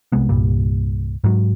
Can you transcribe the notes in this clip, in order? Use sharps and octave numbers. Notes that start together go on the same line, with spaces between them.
C2 C3 G#3 B3
C2 G2 A#2 G3
G#2 F#3